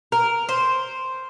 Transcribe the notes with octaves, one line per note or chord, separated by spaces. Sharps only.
A#4
C5